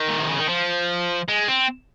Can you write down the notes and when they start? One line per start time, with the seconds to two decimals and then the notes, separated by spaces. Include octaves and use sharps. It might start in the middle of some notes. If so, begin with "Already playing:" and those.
Already playing: D#3
0.09 A#2
0.19 C3
0.29 C#3
0.38 D#3
0.49 F3
1.28 G#3
1.48 C4